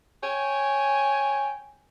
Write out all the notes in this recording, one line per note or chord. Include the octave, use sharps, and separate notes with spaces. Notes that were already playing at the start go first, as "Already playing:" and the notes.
C#5 G5 G#5